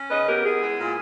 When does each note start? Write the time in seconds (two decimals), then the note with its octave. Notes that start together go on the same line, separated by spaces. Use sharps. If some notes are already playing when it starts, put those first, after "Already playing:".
Already playing: C#4
0.10 C#3 B4 D#5
0.27 B3 G4 A#4
0.45 B3 E4 G#4
0.62 G#3
0.79 A#2